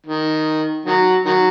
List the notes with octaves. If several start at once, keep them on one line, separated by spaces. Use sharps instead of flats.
D#3
D#3 F#3
D#3 F#3